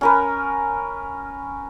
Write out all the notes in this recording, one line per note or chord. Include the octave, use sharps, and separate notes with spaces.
C#4 A#4 B4